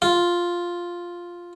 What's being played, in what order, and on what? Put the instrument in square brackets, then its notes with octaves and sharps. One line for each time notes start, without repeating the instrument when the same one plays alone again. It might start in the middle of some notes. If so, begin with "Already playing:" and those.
[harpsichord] F4